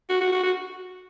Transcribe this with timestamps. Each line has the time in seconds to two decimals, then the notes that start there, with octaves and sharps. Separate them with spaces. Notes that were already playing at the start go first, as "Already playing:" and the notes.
0.09 F#4
0.21 F#4
0.32 F#4
0.43 F#4